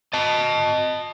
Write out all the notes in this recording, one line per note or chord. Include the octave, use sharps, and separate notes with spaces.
D#5 A5